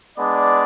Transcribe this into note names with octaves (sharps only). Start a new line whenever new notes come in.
G#3 B3 D4 D5